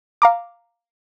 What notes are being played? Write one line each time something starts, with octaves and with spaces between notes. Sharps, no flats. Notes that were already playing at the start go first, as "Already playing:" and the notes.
F5 A#5 D6